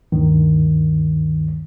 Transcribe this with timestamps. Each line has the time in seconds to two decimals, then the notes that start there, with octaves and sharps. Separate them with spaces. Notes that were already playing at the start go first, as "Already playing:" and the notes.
0.12 D2 G2 D#3